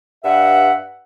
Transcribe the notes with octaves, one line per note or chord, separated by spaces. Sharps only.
G2 E5 F#5